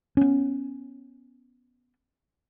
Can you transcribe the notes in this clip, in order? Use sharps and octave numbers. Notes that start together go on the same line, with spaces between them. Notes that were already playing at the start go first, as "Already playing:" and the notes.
B3 C#4